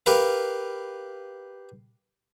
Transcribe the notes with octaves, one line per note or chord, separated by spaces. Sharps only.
G4 A#4 B4 F5